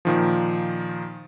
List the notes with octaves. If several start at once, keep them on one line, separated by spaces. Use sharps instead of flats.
A#2 D#3 F3